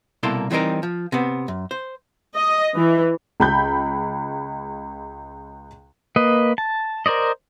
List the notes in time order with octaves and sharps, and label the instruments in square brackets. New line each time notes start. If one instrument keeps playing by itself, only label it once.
[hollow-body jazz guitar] C2 B2 A#3 E4 A4 C6
E3 G3 C4 D#4 A#4
F3
C3 B3
F#2
C5
[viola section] D#5
E3
[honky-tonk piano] C#2 B5 G6
[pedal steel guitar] A#3 B4 D#5
A5
A#4 C5 D5 D#5